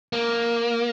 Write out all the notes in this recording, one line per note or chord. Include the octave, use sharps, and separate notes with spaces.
A#3